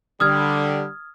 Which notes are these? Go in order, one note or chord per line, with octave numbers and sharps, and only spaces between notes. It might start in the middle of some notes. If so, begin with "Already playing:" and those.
D3 G3 D#6 F6 G#6